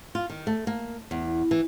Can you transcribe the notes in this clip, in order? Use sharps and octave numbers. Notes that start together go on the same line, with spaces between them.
F4
D#3
A3
A#3
E2
E3